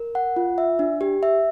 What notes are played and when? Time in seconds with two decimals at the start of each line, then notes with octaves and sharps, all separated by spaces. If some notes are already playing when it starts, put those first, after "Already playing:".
Already playing: A#4
0.15 F#5
0.36 F4
0.58 E5
0.79 D4
1.01 G4
1.23 E5